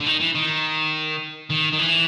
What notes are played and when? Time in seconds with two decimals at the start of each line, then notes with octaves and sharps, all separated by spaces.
0.01 D3
0.07 D#3
0.21 E3
0.35 D#3
1.51 D#3
1.73 D#3
1.79 E3